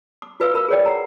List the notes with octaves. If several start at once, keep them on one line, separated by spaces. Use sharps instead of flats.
D6
F4 F#4 B4 E5 F5 E6
A#4 B5 E6
G#4 A#4 C#5 D5 G5
F#5 A#5